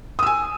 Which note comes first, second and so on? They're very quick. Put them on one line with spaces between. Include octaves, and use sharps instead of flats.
D#6 E6 G#5